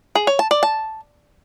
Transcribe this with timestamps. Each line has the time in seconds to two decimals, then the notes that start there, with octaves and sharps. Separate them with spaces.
0.15 G#4
0.27 C#5
0.39 A5
0.51 D5
0.63 A5